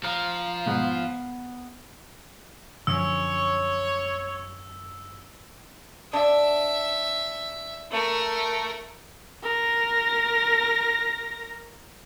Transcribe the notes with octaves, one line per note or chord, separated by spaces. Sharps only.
F3 F5 A#5 F6
G#2 B2 B3
F#2 D3 F3 C#5 E6
D4 E5
A3 A#4
A#4 A#6